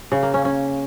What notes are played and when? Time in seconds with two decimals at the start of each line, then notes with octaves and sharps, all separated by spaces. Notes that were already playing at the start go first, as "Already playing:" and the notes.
0.12 C#3
0.23 A#3
0.34 C#4
0.45 C#4